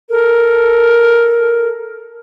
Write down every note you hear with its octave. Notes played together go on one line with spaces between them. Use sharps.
A4 A#4